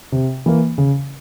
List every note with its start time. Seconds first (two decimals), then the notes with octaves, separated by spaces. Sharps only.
0.12 C3
0.46 E3 A#3
0.78 C#3